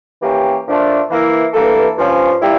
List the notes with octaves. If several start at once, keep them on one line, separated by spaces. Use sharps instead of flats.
E3 A#3 C#4 G4
A#2 F3 A3 D4 F4
E3 A#3 E4
G2 E3 A#3 E4 A4
G2 F3 C#4
A#2 G3 A#3 E4 G4